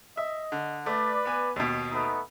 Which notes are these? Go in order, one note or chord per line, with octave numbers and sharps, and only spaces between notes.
D#5 E5
D3
A3 B4 D5
B3 G#5
D#2 B2
A3 B3 D#4